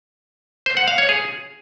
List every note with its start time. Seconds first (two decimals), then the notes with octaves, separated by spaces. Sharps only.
0.66 C5
0.77 F#5
0.88 F5
0.98 C#5
1.09 G#4